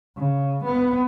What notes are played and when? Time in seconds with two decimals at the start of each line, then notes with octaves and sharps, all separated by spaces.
0.17 C#3
0.65 B3